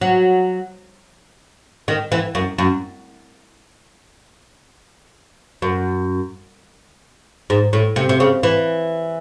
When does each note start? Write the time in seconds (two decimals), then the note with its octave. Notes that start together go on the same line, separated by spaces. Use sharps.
0.01 F#3
1.88 D#3
2.12 E3
2.35 F#2
2.58 F#2
5.62 F#2
7.50 G#2
7.73 A2
7.96 C3
8.09 C3
8.20 C#3
8.43 E3